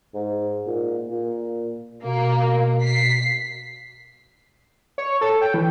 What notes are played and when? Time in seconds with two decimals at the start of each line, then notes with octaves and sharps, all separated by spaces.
0.14 G#2
0.67 A#2
1.10 A#2
2.04 B2 A#3
2.82 B6 C7
4.98 C#5
5.21 A4
5.42 G5
5.54 E3